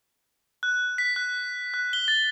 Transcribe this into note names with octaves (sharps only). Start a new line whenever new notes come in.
F#6
B6
F#6
F#6
G7
A6